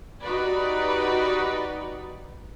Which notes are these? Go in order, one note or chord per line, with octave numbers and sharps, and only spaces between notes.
D#4 F#4 G4 B4 D5